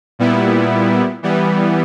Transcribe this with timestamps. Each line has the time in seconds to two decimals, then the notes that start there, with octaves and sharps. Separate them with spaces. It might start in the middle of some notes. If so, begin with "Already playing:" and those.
0.19 A#2 G3 B3 E4
1.23 E3 G3 B3